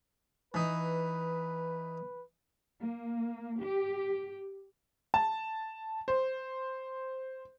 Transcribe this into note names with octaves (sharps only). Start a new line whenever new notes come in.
E3 D#4 B4
A#3
G4
A5
C5